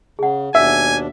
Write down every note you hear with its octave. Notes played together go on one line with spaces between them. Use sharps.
C#3 G#4 F#5
D#2 B2 D4 E5 G#5